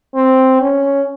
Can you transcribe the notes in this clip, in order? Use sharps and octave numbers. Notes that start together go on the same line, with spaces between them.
C4
C#4